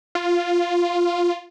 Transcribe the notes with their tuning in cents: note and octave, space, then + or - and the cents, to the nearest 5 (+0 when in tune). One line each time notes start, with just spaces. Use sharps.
F4 +0